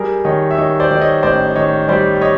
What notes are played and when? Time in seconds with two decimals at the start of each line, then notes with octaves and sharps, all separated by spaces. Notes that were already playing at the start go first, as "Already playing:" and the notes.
Already playing: G3 G#4 A#4
0.25 D#3 C#5 D#5
0.51 E5
0.57 D#3 C#5 D#5
0.80 C5 D5
0.91 D#3 D5
1.01 C#5 D#5
1.23 A1 C5 D5
1.55 D#3 C#5 D#5
1.88 G3 C5 D5
2.21 C#5 D#5